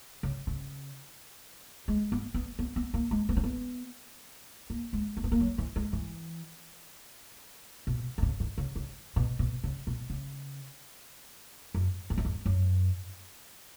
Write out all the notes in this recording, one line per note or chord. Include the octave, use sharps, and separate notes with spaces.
C#3
C#3
G#3
B3
B3
B3
B3
A#3
G#3
B3
C#4
B3
A#3
G#3
A#3
B3
A#3
F#3
E3
G#3
E3
B2
D#3
C#3
D#3
C#3
C#3
B2
B2
C#3
B2
C#3
F#2
E2
F#2
E2
F#2